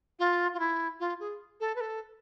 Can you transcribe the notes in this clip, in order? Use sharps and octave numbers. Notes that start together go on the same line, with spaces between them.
F4
F4
E4
F4
G#4
A4
B4
A4